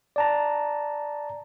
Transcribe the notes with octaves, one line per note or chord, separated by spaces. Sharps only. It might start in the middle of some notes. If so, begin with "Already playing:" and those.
D5 A5 A#5